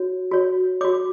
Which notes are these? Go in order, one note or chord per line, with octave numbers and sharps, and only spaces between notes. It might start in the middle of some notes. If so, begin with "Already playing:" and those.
Already playing: F#4 C#5
F#4 C#5
F#4 C#5 D6